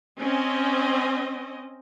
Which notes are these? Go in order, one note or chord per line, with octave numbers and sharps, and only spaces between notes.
C4 C#4 D#5